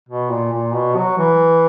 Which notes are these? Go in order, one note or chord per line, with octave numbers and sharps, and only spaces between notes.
B2
A#2
A#2
B2
F#3
E3